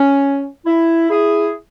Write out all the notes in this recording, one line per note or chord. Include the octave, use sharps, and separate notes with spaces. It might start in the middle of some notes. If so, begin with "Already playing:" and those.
Already playing: C#4
E4
E4 G#4